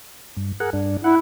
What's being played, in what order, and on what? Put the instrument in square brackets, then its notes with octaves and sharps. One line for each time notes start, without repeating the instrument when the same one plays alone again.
[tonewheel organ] G2
G#4 A#4 F#5
G2 D4
[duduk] E4 [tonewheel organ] F#5